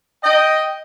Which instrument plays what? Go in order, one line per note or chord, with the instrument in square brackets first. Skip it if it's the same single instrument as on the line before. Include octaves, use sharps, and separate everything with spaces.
[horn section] D#5 G5